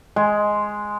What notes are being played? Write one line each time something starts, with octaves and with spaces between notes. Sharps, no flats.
G#3